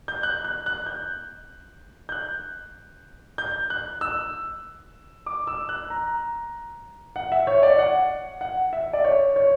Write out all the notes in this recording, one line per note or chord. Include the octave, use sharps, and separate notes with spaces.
G6
F#6
F#6
F#6
G6
G6
F#6
G6
F#6
E6
D6
E6
F#6
A#5
F#5
E5
C#5
D5
F#5
F#5
E5
D5
C#5
C#5